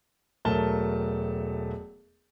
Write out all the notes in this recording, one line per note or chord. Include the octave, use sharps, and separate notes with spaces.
E1 F#3 A3 A#4 A5 G7